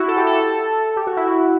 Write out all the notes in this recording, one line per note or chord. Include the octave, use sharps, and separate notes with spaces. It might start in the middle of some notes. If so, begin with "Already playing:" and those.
Already playing: E4 F#4
A4
G4
A4
G4
F#4
E4
F#4